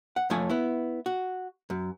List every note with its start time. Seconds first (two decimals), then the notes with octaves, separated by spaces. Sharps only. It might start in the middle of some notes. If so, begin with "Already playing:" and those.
0.16 F#5
0.30 F2 F3 A3 C#5 G#5
0.50 B3 E4
1.06 F#4
1.70 F#2